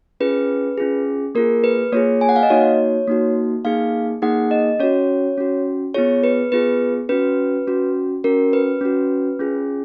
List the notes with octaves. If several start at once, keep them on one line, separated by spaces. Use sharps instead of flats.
C#4 F4 G#4 B4
C#4 F4 G#4
A#3 F4 G#4 A#4
B4
A#3 F4 G#4 C#5
G#5
F#5
F5
D#5
A#3 D#4 F#4 C#5
A#3 D#4 F#4
A#3 D#4 G#4 F5
A#3 D#4 G#4 F#5
D#5
C#4 F#4 C#5
C#4 F#4
B3 F4 G#4 C#5
B4
B3 F4 G#4 B4
C#4 F#4 B4
C#4 F#4
C#4 F#4 A#4
B4
C#4 F#4
C#4 F4 G#4